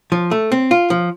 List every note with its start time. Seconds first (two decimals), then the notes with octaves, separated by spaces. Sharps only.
0.12 F3
0.31 A3
0.52 C4
0.71 F4
0.90 F3